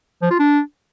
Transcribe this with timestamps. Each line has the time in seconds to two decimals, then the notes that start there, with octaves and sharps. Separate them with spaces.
0.22 F3
0.31 F4
0.39 D4